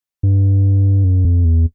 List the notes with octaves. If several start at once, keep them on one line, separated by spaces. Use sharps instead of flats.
G2
F#2
F2
E2